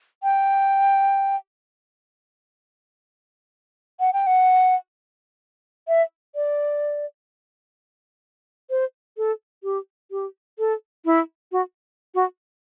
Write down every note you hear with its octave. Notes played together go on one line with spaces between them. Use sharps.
G5
F#5
G5
F#5
E5
D5
C5
A4
G4
G4
A4
E4
F#4
F#4